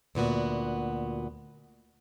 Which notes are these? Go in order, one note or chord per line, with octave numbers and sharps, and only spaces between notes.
D2 A#2 B3 F#4